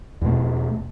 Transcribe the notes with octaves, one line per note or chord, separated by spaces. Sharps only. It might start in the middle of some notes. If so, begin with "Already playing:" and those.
E2 B2 A3